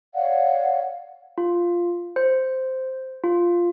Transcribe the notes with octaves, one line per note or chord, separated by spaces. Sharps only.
C#5 D5 F5 F#5
F4
C5
F4